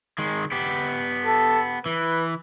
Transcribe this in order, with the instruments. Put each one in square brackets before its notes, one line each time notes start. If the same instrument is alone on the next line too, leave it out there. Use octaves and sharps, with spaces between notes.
[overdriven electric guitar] D#3 G#3
B3 G4
[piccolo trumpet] A4
[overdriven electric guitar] E3 [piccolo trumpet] B4